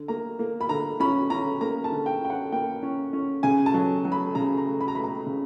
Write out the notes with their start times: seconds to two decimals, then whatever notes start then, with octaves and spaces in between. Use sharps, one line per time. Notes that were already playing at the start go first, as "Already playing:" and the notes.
Already playing: D3
0.08 A#3 A#5
0.39 A#3
0.61 B5
0.69 D3 A#5
1.00 C#4 B5
1.30 C#4 A#5
1.61 A#3 A#5
1.84 A5
1.92 D3
2.06 G5
2.22 C#4 G5
2.30 F#5
2.52 A#3 G5
2.83 C#4
3.13 C#4
3.43 C#3 G#5
3.66 A5
3.74 F#3
4.05 F#3
4.12 B5
4.35 C#3 A#5
4.58 A#5
4.66 A3
4.81 B5
4.88 A#5
4.95 A3 B5
5.04 A#5
5.26 C#3